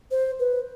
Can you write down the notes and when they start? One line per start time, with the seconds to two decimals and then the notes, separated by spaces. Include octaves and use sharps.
0.11 C5
0.39 B4